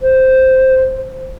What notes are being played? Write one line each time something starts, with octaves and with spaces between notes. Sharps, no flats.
C5